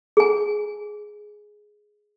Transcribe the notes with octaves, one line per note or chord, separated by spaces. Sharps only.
G#4 G#5